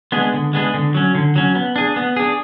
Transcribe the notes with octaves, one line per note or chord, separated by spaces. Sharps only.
G#3 B3 D4 G#4
D3
G#3 B3 D4 G#4
D3
F#3 C#4
D3
F#3 C#4
B3
D4 G#4
B3
D4 G#4